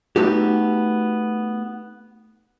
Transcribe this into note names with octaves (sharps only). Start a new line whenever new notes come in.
A3 B3 D#4 F#4 G4